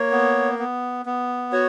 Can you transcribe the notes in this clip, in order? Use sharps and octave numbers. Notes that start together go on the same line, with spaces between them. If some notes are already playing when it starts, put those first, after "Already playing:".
Already playing: A#3 C#5
B3
B3
B3
F#4 C#5